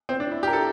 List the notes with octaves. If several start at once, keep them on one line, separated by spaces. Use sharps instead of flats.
C4
D4
E4
G4
A#4
A4